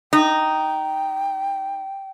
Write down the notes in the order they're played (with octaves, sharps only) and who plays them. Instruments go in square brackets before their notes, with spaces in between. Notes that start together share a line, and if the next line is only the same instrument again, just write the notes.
[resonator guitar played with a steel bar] D#4 [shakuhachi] G5